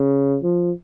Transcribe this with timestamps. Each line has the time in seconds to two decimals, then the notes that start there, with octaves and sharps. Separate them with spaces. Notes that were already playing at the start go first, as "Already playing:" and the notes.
Already playing: C#3
0.43 F3